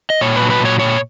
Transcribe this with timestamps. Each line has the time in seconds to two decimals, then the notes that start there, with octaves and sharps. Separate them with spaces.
0.10 D#5
0.21 A#2 C#5
0.36 B4
0.41 F#3
0.50 B4
0.60 A#2 C#5
0.79 A#2 C#5